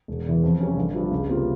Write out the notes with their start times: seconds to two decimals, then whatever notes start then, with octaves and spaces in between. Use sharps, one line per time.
0.08 E1
0.26 E2 E3
0.43 F2
0.60 C3 G3 C#4
0.77 G1
0.94 G2 F3
1.11 C#2
1.29 C3 G3 A#3 F4